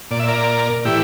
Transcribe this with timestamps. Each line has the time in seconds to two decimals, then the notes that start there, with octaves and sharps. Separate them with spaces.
0.11 A#2 D5
0.19 E5
0.28 A#4 D5
0.85 A2 E3 E4 G4